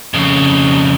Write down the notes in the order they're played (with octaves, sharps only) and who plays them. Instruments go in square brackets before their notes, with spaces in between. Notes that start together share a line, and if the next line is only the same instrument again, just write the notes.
[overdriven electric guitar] F2 C#3